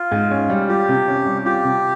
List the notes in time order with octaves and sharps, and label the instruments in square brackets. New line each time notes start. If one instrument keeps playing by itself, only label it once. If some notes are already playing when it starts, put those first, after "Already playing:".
Already playing: [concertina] F4
[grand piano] G#2
C#4
G3
[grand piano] F4 [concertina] G4
[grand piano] C3
C#4
G3
[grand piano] F4 [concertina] G4
[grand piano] C3